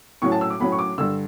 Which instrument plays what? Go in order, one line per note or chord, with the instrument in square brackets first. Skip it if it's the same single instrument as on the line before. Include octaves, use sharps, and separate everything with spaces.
[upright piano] A2 F#3 C#4 C#6
A5
E6
D6
A2 F#3 C#4 B5
C#6
D6
G2 D3 E6